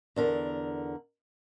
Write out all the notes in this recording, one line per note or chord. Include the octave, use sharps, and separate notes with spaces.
E2 D3 A#4